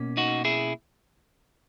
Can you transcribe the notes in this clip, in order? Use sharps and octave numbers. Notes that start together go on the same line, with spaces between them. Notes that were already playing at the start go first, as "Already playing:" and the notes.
Already playing: B2 A#3 C#4
D#4 F#4
E4 G#4